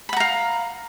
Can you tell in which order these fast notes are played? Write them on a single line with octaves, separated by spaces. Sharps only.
B5 F#5 A#5 F5